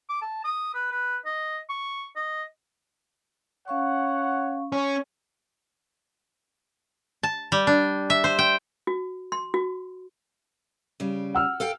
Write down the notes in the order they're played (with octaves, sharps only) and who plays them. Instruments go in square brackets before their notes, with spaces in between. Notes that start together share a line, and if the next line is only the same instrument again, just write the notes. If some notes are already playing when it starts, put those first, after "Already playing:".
[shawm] D6
A5
D#6
B4
B4
D#5
C#6
D#5
[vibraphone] C#4 F5 C#6 [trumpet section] C#5 F#5
[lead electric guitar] C#4
[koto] A5
G3
D4
E5
C5
G5
[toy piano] F#4
C6
F#4
[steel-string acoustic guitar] C#3 G3
[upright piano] F#5 E6 F6
[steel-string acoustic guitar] A4 F5 G5